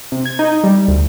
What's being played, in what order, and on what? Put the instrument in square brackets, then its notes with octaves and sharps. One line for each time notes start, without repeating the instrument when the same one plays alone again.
[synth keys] C3
G#6
D#4
G3
D2